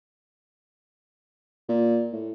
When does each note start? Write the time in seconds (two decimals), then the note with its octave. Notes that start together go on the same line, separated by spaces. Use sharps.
1.69 A#2
2.13 A2